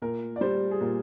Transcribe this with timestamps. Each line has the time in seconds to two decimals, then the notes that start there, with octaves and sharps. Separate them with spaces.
0.02 A#2 A#4
0.36 D5
0.41 G3 C5
0.71 G#4
0.81 A#2 A#4